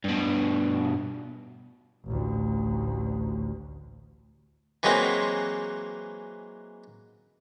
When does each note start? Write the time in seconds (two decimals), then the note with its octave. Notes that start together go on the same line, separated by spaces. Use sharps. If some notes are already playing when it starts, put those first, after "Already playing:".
0.04 G2 B2
2.06 A1 D2
4.83 E3 F#3 G#3 A#3 C4